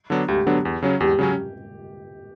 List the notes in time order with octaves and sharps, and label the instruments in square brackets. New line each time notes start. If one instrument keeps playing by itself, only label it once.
[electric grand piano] D3 F#3 B3 D4
[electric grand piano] D2 [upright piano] G4
[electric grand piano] D3 F#3 B3 D4
E2
C#3 F#3 C#4
[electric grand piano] E2 [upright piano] G4
[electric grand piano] C#3 F#3 C#4